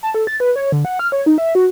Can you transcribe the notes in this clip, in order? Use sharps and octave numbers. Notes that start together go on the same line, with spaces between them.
A5
A4
A6
B4
C#5
D3
F#5
F6
C#5
D#4
E5
F#4